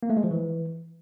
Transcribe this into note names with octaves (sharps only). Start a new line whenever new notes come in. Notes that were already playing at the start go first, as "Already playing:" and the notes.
A#3
A3
G#3
F3
E3